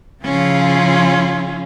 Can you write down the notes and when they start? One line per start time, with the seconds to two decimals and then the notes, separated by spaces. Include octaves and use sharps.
0.24 C#3 F3 C#4 E4 F4 G#4